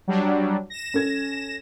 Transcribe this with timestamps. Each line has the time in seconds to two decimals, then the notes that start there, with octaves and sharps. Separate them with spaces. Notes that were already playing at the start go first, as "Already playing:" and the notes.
0.08 F#3 G3 D4
0.70 A#6 E7
0.94 C#4 A4 G#6